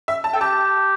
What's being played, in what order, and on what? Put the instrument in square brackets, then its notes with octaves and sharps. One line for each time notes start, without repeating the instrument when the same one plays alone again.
[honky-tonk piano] E5
A5
[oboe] A4 [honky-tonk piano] G5
[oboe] G4 [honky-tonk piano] A5